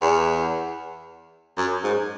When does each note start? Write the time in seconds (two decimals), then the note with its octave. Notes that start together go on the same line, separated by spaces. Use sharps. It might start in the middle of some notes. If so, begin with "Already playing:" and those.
0.02 E2
1.57 F#2
1.83 G#2